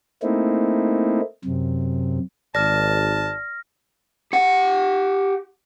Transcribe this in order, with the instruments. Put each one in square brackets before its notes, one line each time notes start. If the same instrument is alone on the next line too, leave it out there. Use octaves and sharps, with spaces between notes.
[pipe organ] A3 A#3 C4 D#4 E4
F#2 C3
[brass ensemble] G#1 [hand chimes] D5 [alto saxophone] A5 [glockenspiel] F6 A#6
[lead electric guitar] G4 F#5